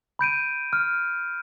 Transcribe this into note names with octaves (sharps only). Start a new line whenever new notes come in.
B5 G6 D7 D#7
F6